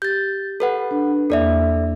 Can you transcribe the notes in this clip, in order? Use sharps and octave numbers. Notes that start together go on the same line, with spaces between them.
G4 G6 A6
A4 B4 F#5
D4
E2 A#3 A4 D5 E5